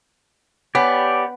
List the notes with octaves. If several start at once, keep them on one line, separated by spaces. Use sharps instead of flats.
B3 G4 C#5 D5 G#5 B5